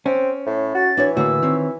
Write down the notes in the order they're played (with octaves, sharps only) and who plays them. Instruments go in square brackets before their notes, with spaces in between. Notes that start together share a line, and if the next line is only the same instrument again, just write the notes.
[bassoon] C4 [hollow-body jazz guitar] C#4
[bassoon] A2
[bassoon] F#4 [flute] A6
[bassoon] E3 [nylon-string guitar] D4 F#4 C#5
[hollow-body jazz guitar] A2 D3 A#3 [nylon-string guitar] F#4 [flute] E6
[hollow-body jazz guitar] D#3 C4 C#5